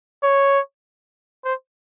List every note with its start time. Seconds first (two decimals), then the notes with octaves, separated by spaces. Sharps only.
0.23 C#5
1.44 C5